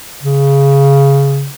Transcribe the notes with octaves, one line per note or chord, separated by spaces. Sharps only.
C#3